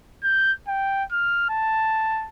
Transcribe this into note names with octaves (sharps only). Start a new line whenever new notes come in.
G6
G5
F6
A5